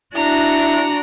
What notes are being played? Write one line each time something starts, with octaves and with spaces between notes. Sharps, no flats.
D4 E4 F#4 A#5